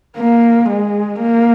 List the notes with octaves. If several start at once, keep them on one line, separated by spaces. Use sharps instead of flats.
A#3
G#3
A#3